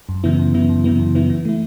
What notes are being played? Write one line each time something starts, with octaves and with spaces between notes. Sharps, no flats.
F#2
C#3 E3 B3 E4
F#2
C#3 E3 B3 E4
F#2
C#3 E3 B3 E4
F#2
C#3 E3 B3 E4
E3
A3 E4